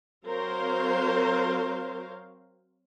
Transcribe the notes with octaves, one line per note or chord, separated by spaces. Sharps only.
F#3 C4 A#4 C5 C#5 F5